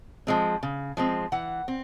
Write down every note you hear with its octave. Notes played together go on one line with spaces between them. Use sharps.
F3 G#3 C4
C#3
F3 G#3 C4
E3 F#5
C4